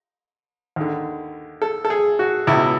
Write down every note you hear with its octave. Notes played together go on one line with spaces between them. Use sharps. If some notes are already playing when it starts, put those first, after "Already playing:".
D#2 D3
A4
A4
G#4
F#4
C#2 B2 E4